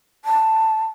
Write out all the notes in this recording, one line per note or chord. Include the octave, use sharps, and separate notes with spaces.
A5